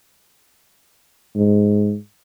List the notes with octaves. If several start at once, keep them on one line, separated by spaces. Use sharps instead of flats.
G#2